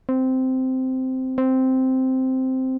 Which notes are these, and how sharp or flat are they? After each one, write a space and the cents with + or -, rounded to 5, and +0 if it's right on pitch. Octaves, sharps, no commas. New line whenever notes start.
C4 -10
C4 -5